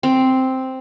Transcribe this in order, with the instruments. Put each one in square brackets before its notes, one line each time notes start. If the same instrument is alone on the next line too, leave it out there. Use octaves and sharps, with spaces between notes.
[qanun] C4